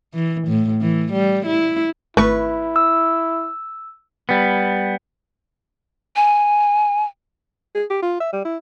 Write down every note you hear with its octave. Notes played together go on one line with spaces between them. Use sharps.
E3
A2
E3
G3
E4
G#1 A3 E4 B4 C#6
E6
G3 B3
G#5
G#4
G4
F4
E5
G3
E4